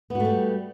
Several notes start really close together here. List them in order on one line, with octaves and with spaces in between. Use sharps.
B3 F#4 A3 G3